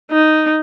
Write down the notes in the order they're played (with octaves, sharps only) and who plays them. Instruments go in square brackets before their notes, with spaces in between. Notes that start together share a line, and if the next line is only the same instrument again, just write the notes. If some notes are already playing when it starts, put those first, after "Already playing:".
[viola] D#4